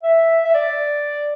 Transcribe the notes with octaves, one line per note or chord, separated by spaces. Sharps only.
E5
E5
D5